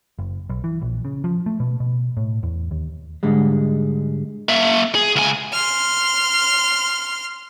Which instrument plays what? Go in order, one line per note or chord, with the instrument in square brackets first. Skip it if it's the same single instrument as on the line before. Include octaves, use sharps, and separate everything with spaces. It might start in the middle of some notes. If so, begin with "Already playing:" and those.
[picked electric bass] F#1
B1
E3
A#1
C#3
F3
A3
B2
B2
A2
E2
D#2
[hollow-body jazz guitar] G#2 D3 G3 G#3
[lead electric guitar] A#3 E5
G#4
C#2 G#5
[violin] C6 F6